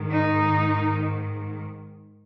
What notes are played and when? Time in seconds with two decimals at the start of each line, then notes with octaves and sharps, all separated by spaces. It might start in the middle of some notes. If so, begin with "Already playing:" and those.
Already playing: G#2 D#3
0.11 D#4